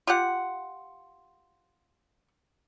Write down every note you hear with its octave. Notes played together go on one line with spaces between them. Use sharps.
F4 G4 F#5